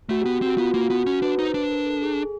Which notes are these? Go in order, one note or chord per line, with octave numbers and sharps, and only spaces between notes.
A3 F#4
G4
B3
C4 F#4
B3 F4
A#3 F#4
B3 F#4
C#4 F#4
D4 B4
D#4 C5
D4 B4
A#4
A4
G#4